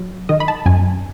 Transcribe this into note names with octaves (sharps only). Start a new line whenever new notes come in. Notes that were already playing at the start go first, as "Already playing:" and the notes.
Already playing: F#3
D#3 D#5
B5
A5
F#2 G#5